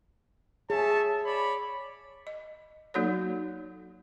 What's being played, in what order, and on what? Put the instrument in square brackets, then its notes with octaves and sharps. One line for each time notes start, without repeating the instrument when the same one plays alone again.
[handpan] G#4 [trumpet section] C#5 E5 A5
[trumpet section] C#5 D5 B5
[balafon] D#5
F#3 A#3 D#4 F#4 A4 C#5